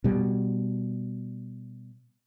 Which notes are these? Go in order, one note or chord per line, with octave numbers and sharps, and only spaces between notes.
B2 G3